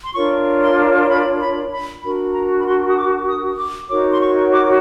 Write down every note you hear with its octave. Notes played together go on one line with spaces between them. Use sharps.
C6
D4 F4 A#4 C#5 C#6
C6
C6
B5
B5
B5
D4 F#4 A#4 B5
A#5
B5
C6
D#6
D6
D#6
D6
D#4 F#4 A#4 C#5 D6
C6
C#6
D6